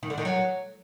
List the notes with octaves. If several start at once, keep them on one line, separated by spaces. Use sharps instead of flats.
D#3
D3
D#3
F#3